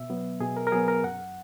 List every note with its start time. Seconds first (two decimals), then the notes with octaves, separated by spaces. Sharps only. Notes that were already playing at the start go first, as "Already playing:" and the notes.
Already playing: B2 E5
0.10 F#3 B3
0.40 B2 G#4
0.57 A#4
0.67 A#4
0.72 F#3 B3 G#4
0.88 A#4
1.03 F#2 F#5